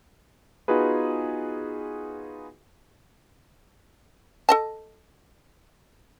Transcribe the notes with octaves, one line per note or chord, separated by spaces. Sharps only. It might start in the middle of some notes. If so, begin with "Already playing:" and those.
B3 D#4 F4 F#4 G#4 B4
A4 D#5 A5